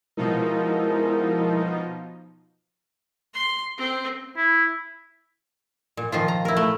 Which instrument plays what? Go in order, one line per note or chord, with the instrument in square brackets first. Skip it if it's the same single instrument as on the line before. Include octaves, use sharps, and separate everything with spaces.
[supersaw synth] B2 F3 D#4 [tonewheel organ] G#3 E4 A#4
[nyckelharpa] C6
C4
[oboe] E4
[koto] A#2
D#3 F3 F4
A#5
E4 A#4
A3